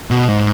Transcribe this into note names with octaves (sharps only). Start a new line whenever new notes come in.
B2
G#2